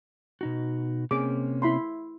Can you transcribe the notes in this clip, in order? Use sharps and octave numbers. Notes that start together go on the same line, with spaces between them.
B2 D#4 F#4
C3 A#3 C#4 G#4 D6
E4 B5 C6